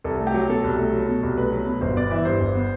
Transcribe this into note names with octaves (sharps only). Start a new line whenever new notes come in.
C2 A4
A3
G4
F#3
B2 A4
C2
A3
F#3
B2
C2
A3 B4
F#3
B2
G1 C5
B3 D5
E3 E5
G2 C5
G1
B3